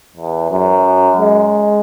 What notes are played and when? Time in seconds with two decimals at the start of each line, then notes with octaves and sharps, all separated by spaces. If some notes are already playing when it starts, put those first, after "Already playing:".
0.16 E2
0.51 F#2
1.18 G#3